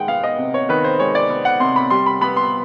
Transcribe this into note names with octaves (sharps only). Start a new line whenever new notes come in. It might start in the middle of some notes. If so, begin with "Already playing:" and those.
Already playing: D#3 G#3 F#5 G5
B3 F5
D#5
C3
C#5
D#3 B4
C5
G#3 C#5
D5
B3
F#5
C3 C6
B5
G3 C6
B5
B3 B5
C6